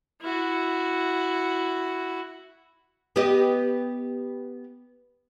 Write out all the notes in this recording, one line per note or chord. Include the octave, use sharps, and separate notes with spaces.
E4 F#4
B3 G4 D#5